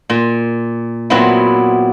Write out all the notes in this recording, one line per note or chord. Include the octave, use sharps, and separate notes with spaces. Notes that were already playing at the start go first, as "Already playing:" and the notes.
A#2
A#2 F#3 B3 C4 E4